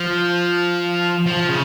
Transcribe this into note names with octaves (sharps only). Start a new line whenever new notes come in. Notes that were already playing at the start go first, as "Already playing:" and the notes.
Already playing: F3
F3
C#3